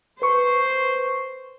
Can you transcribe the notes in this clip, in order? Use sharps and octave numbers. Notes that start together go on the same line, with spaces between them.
B4 C5 C#6